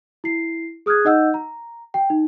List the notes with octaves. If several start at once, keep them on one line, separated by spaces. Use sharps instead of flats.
E4 C7
G#4 D#6 F6 F#6 G#6
D#4 D#5 F#5 E6 G6
A#5
G5
D#4